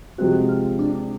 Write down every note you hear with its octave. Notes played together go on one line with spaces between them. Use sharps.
C3 F3 G#3 C4 F#4
F4
D4